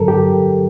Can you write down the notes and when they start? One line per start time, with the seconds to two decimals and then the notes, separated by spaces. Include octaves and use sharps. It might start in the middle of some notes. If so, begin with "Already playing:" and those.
Already playing: G2 D3 F#3 A4 A#4
0.08 G4